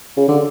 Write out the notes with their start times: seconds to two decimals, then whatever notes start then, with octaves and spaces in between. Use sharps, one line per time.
0.17 C#3
0.28 D3